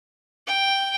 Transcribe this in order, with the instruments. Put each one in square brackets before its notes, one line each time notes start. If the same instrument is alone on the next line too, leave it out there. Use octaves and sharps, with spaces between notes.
[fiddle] G5